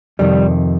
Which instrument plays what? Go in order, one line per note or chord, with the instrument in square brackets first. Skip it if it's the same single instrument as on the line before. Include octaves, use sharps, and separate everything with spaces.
[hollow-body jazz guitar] F2 C3 D#3 G3